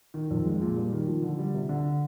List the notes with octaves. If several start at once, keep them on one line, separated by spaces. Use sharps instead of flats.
D#3
F2
G#3
A#2
G3
D#3
F3
D3
G3
C3
D3